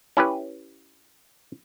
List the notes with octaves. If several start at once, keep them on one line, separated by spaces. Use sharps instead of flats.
C#4 E4 G4 B4